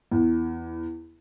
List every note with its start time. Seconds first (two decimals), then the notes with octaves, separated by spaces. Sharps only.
0.12 E2